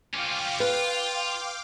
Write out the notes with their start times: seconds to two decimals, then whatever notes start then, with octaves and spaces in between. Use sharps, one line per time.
0.14 C#4 F4 F5 G5 D6
0.60 F4 B4